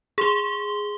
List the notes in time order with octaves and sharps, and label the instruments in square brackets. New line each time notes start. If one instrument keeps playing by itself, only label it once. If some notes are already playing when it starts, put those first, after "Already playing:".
[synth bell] G#4 C6 G7